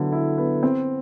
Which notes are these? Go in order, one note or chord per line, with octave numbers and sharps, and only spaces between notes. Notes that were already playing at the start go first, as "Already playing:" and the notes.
Already playing: D3 F#3 B3 E4
E4
B3
C4